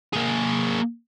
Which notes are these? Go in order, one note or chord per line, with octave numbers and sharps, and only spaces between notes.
A#3 G#4